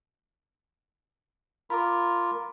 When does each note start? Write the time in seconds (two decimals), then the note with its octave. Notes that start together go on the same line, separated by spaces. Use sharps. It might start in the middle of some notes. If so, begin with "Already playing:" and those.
1.70 F4 A#4 B5 D6